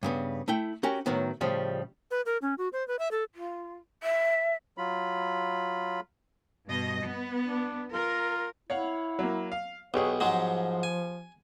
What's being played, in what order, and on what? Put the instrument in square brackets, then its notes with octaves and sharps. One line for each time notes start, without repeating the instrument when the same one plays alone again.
[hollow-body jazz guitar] G2 C#3 B3
A3 E4 G5
C#4 F#4 G4 A#4
A2 D#3 F#3 B3
A2 C#3 F3 G3
[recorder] B4
A#4
C#4
F#4
C5
B4
E5
A4
[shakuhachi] F4
E5
[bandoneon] F#3 F4 B5
[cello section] G2 B2 D#5
B3
[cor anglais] D4
[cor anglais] F4 [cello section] A#4
[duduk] E4 [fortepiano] C#5 F5 F#5
[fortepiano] F#3 A#3
F5
[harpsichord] B1 [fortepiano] B3 G4 G#4 [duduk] C#5
[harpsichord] G#2 F#3 G#3 [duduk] F3
[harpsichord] G#5